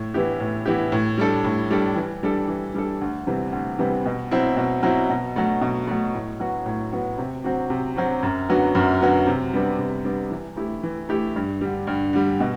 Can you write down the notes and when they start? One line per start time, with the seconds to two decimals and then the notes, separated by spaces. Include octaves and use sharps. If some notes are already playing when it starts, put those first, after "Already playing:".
Already playing: A2
0.14 E3 B3 E4 G4
0.40 A2
0.66 E3 B3 E4 G4
0.92 A2
1.18 G3 D4 A4
1.44 A2
1.71 G3 D4 A4
1.96 E3
2.23 G3 D4 A4
2.48 E3
2.74 G3 D4 A4
3.01 D2
3.27 C3 E3 G3 B3
3.52 D2
3.79 C3 E3 G3 B3
4.06 B2
4.31 F#3 C4 E4
4.57 B2
4.83 F#3 C4 E4
5.09 B2
5.36 F#3 A3
5.61 B2
5.87 F#3 A3
6.14 A2
6.40 F#3 B3 F#4
6.66 A2
6.92 F#3 B3 F#4
7.18 C3
7.44 F#3 C4 F#4
7.70 C3
7.96 F#3 C4 F#4
8.23 F#2
8.49 D3 F#3 B3 F#4
8.75 F#2
9.01 D3 F#3 B3 F#4
9.27 C3
9.53 G3 B3 D4
9.79 C3
10.05 G3 B3 D4
10.31 E3
10.57 A3 E4 G4
10.83 E3
11.09 A3 E4 G4
11.36 G2
11.61 D3 G3
11.87 G2
12.13 D3 G3
12.40 B2